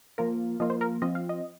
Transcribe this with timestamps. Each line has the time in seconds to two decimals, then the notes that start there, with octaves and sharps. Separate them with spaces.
0.18 F3 A#3 F4 A#4
0.60 F3 A#3 F4 D#5
0.70 C5
0.81 A#4
1.02 F3 C4 F4 D#5
1.15 F5
1.29 D#5